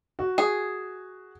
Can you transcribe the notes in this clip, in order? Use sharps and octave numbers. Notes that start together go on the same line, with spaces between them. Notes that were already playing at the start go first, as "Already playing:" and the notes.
F#4
G#4